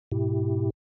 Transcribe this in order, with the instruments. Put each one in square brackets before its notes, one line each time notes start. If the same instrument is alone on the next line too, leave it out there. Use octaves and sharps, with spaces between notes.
[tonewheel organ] G#2 B2 E4 G4